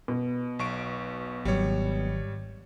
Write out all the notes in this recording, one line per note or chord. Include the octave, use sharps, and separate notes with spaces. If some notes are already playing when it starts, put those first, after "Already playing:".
B2
B1 C#6 D7
G#1 F#3 G3 C#5